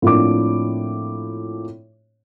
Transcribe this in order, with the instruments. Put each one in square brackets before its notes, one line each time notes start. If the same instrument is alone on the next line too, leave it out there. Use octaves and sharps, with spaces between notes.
[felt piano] A2 F3 A#3 C4 D4 D6